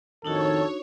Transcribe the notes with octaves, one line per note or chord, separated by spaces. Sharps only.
F2 A2 D#3 D4 D#4 F#4 A4 C#5